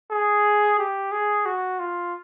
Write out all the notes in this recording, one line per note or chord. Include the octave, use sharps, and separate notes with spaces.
G#4
G4
G#4
F#4
F4